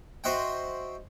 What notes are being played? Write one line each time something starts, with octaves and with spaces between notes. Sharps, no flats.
F#4 C5 D#5 E5 F#5 G5